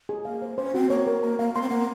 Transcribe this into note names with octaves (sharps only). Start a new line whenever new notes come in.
G#4
A#3 F5
C5
C#4 C5
C4 F#4
A#3 C#5
A#4
A#3 A#5
A#3 F5
A#3 C6
C4
A#3 F#5